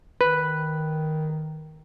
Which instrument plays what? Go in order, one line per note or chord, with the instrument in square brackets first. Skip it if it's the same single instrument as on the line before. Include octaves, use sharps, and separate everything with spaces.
[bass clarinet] D#3 [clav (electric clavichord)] B4